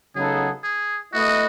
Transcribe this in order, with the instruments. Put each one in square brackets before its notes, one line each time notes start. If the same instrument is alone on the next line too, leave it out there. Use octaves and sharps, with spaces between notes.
[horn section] C#3 F#3 B3 D#4 A4 [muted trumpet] G#4
[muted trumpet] G#4
[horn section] A3 E4 B4 D#5 [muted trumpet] F#4